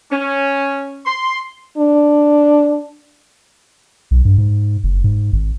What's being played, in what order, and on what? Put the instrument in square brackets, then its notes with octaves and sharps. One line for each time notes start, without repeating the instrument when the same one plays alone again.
[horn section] C#4
C6
[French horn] D4
[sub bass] B1
G2
G#2
F#1
G#2
G#1